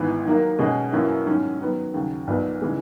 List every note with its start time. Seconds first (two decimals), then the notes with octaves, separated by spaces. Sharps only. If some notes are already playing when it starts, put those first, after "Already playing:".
Already playing: G#1 G#2 E3 B3
0.24 D#3 F#3 A#3
0.59 B2 G#3 C#4 G#4 D#5
0.92 F#2 E3 A#3 C#4 E4
1.26 G#2 D#3 F#3 C#4
1.60 D#3 F#3 B3
1.94 D#2 C#3 F#3
2.27 B1 A#2 F#3 B3
2.62 C#3 E3 G#3